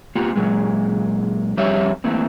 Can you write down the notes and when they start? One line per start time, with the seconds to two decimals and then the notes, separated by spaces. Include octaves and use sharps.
0.15 A#3 B3 F4 G4
0.36 A#2 F#3 G#3
1.57 F2 G3 G4 C#5 E5 F5
2.04 E3 A3 A#3 C4